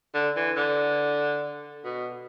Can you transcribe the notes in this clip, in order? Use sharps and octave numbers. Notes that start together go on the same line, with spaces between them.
D3
E3
D3
B2